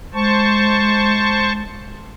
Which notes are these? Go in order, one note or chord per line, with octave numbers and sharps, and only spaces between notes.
G#3 C5 A5 C#6